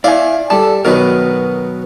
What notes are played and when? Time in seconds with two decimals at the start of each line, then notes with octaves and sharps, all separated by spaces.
0.04 E4 D5 F5 G#5
0.50 G3 A4 A5
0.85 B2 D#3 F#3 A#4 B4